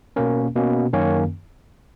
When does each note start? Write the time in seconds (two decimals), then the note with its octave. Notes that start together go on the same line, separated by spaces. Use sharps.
0.16 B2 A#3 C#4 A#4
0.55 B2 A#3 C#4
0.93 F#2 D#3 A#3 C#4 C#5